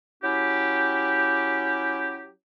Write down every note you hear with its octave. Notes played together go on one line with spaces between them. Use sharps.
F#3 C#4 E4 G4